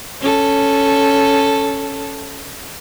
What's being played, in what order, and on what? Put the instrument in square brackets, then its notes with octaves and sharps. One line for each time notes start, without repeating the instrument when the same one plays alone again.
[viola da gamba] C#4 A4